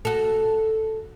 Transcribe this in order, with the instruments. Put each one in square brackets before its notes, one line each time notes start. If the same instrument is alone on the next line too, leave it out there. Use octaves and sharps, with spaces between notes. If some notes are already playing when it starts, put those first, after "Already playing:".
[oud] F#4 A4